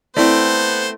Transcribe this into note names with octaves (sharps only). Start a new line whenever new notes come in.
A3 B3 C4 E4 C5 D5